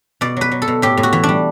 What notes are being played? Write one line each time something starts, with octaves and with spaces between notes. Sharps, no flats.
B2 D5
F#3 B4
F#3
A4
B2
A2 G4
A2
F#4
E3
D4
G3